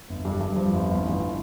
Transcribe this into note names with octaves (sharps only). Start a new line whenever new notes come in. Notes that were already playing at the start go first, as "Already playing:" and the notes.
G1
G2
G2
F3
G1
G1
A1